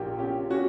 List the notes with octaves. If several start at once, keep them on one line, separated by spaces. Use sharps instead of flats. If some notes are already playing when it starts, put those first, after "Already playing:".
Already playing: A#1 A#2 G4 A#4
C#4 G4
C#4 F#4